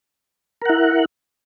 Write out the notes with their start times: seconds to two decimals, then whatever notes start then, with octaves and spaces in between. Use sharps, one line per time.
0.62 A#4
0.65 F#5
0.69 E4